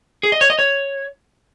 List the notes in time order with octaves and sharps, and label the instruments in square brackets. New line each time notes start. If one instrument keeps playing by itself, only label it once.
[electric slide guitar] G#4
D#5
C#5
D#5
C#5